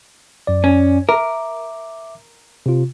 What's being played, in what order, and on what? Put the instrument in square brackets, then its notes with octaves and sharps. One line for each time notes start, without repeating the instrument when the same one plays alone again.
[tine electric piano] F#2 D5
[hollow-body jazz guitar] C#4
[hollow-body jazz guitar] A#4 [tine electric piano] E5 D6
[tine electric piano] C3 F4